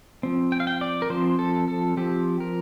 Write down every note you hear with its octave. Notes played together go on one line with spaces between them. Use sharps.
F3 C4
G5
F5
G5
D5
A#4
F3 C4 C5
A4
A4
F3 C4 G4
A#4